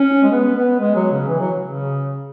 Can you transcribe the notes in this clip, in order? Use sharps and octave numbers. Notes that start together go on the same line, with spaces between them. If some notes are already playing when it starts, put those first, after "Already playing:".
Already playing: C#4
G#3
B3
B3
G#3
F#3
C#3
E3
F#3
C#3